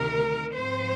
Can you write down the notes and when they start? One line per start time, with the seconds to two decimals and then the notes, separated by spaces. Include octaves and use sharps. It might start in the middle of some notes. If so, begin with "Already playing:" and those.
Already playing: D2 C3 D#3 A#4
0.55 G#2 F3 C4 C5